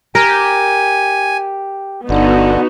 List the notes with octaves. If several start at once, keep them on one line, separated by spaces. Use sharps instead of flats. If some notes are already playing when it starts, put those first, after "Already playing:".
G4 A#4 G#5
G1 D3 B3 D#4 F#4